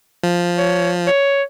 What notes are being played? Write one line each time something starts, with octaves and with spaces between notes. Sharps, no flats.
F3
C#5
C#5